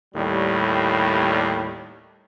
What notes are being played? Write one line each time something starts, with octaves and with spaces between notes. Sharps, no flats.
D#2 A2 G3